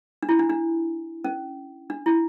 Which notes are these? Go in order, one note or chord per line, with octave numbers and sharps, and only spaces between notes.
D4
E4
D4
D4
C#4
D4
E4